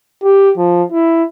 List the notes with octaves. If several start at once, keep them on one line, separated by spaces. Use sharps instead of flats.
G4
F3
E4